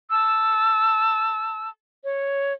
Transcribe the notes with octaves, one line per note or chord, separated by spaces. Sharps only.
A5 E6
C#5